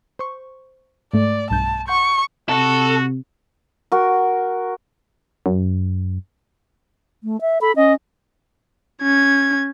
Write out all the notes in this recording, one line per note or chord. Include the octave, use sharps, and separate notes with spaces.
C5 C#6
G#2 A3 D5
B1 G2 A5 G6
F#5 C6 C#6 G6
C3 F#4 A4
F#4 A#4
F#2
A3
E5
A4 B5
C#4 D#5
C#4 G#6